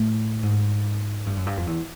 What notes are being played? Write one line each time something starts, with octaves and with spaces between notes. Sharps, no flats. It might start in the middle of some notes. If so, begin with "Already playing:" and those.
Already playing: A2
G#2
G2
F#2
G2
F2
E2